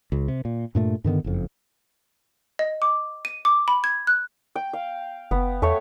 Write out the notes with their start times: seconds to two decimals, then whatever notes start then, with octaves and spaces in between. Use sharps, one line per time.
0.12 C#2
0.28 C3
0.45 A#2
0.75 G2 A#2 A3
1.04 G2 D3 D#3 B3
1.24 F#1 F2
2.59 D#5
2.82 D6
3.25 D#7
3.45 D6
3.68 B5
3.84 G#6
4.07 F#6
4.55 G5
4.73 F5
5.31 F#1 B3
5.62 E2 A3 C#5